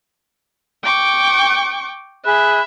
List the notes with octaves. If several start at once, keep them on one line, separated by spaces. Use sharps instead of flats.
G5 C#6 D6
G#4 E5 B5 F#6